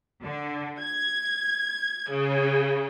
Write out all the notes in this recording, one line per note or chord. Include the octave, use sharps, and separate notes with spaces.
D3
G#6
C#3